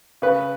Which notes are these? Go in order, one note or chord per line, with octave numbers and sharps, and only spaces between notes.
C#3 B4